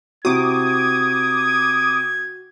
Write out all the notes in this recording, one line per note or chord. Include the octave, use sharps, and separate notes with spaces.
C3 E4 F#4 D6 D#6 G#6